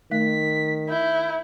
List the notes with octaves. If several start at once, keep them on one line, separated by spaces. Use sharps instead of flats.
D#3 A3 B6
E4 G6